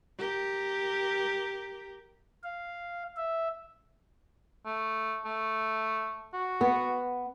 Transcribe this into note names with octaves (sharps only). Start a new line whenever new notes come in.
G4 A#4
F5
E5
A3
A3
F#4
B3 F#5